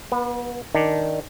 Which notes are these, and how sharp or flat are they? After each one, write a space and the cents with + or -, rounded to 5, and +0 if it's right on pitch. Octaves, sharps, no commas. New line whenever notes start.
B3 -40 B4 +0
D#3 +0 D4 +0